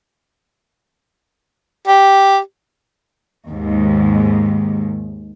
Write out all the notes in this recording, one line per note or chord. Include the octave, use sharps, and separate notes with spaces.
G4
D#2 G#2